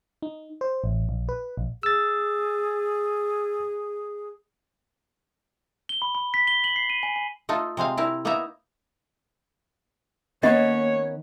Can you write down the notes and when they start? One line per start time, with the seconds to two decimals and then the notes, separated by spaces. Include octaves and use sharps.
0.22 D#4
0.61 C5
0.84 A1
1.09 A#1
1.29 B4
1.57 A#1
1.83 G#4 E6 A6
5.89 G7
6.02 B5
6.15 B5
6.34 B6
6.47 G7
6.64 F#7
6.76 C7
6.90 D#7
7.03 G#5
7.16 G#5
7.49 A3 D#4 F4 A4
7.77 C3 G#3 C4 F5
7.97 C4 E4 A#4
8.25 A#3 B3 D#4 E4 E5 A#5
10.43 D#3 A#3 B3 C#4 C#5 D#5